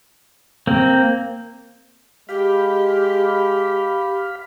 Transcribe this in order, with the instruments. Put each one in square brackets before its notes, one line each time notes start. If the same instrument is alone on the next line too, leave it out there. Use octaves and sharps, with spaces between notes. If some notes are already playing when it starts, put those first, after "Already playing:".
[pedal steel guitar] A#3 C4
[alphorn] G#3 [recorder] G4 [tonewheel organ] F5 B5